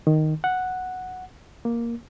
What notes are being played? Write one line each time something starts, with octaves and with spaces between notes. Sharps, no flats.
D#3
F#5
A#3